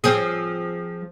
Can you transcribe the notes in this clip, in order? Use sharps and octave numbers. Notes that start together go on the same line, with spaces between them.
F3 C4 G#4